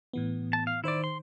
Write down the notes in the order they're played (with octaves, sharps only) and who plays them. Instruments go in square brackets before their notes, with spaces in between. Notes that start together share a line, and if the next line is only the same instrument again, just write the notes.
[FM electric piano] A2 E3 B3
[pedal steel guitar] A5
F5
[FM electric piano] D#3 C5 [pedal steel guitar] E4 D5
[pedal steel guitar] C6